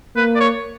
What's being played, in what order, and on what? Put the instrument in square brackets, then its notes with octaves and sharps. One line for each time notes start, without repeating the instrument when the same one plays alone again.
[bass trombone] A#3 [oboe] B4
[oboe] D5
C#5